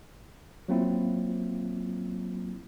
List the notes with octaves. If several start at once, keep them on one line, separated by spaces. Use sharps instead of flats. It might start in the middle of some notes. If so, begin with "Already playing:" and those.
F#3 A#3 C4 E4 F4